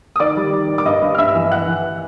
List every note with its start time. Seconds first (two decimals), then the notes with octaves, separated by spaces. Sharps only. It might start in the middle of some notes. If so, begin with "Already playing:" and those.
0.16 D#6
0.20 D#3 D5 D6
0.37 G3
0.53 D#3
0.69 D#3
0.78 D6
0.85 G2 D#5 D#6
1.02 G2
1.15 F6
1.18 G2 E5 E6
1.35 E3
1.51 E3 F#5 F#6
1.68 E3